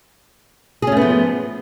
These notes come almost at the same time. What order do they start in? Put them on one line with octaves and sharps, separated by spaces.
G#4 C#4 A3 B3 F3